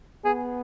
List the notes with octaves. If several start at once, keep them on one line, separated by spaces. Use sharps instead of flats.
B3 G#4